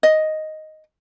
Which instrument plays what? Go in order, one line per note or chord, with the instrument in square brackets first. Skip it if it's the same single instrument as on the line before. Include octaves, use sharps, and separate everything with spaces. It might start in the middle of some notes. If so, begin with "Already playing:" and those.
[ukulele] D#5